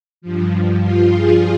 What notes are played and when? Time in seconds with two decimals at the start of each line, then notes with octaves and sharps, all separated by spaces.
0.22 G2 F3
0.82 F4
1.12 G#4